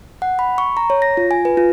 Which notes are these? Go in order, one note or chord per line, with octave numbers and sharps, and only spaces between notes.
F#5
B5
C#6
A#5
C#5
A#6
F4
G#5
B4
F4